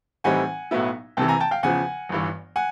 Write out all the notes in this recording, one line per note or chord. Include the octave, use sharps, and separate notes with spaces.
A2 E3 G3 C4 D#4 F#5 G#5
B1 A2 F#3 B3 E4
C2 C3 E3 G5 A5
G#5 A#5
G5 A5
F5 G5
E2 C#3 F3 F#5 G#5
G1 G2 E3
F#5 G#5